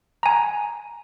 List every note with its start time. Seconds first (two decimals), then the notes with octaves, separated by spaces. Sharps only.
0.23 G#5 A#5